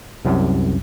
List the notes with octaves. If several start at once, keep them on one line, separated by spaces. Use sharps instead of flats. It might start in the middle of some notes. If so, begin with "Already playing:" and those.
C2 F#2 C3